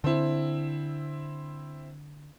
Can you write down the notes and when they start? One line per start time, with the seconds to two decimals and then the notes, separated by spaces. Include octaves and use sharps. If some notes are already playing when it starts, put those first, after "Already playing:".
0.04 D3 C4 E4